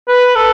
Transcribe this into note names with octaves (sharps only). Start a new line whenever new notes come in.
B4
A4